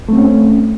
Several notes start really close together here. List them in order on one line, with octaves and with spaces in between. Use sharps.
A3 C4 C#4